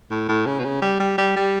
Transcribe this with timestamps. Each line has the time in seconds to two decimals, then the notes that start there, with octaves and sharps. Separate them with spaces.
0.11 A2
0.28 A2
0.46 C#3
0.59 B2
0.64 C#3
0.82 G3
1.00 G3
1.18 G3
1.36 G3